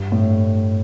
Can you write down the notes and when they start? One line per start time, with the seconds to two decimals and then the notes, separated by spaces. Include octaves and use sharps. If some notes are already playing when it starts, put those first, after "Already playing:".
Already playing: G2
0.12 A2